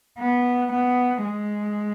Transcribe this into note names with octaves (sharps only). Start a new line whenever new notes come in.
B3
B3
G#3